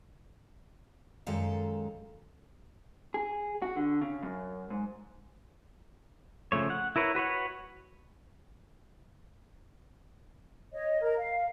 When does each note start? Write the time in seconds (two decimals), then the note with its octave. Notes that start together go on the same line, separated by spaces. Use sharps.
1.26 F#2 D#3 G#3 A4 F5
3.14 G#4
3.62 F#4
3.76 D3
4.01 C#3
4.23 F#2
4.70 G#2
6.52 C#3 F3 A3 C#5
6.70 F#5
6.96 E4 A#4 B4 C#5
7.15 F#4 B4 C#5 F#5
10.73 C#5 D#5
11.01 A#4
11.17 F5